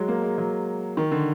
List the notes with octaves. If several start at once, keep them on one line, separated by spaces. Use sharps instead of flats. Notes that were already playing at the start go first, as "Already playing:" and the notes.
Already playing: F#3 G#3
A#3
G#3
F#3
D#3
D3